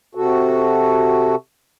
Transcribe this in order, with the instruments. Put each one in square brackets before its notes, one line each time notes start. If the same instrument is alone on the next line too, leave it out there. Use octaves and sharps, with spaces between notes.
[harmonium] C3 F#4 A4